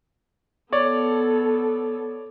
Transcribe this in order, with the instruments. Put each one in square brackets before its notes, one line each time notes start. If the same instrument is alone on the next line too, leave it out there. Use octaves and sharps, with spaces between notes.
[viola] B3 A4 [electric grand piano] C#5 D5